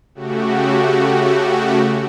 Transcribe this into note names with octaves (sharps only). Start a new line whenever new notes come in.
C#3 A3 F#4 G4